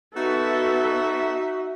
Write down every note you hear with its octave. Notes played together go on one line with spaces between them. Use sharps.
B3 D#4 F#4 A4 E5